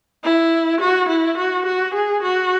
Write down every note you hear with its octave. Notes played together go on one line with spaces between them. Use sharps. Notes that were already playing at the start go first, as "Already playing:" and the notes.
E4
F#4
E4
F#4
F#4
G#4
F#4